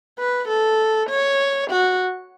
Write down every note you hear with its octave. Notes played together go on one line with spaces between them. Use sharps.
B4
A4
C#5
F#4